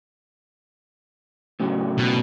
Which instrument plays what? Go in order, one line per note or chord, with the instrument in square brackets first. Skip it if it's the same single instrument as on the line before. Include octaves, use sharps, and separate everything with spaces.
[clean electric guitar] A2 C#3 F#3
[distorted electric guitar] B2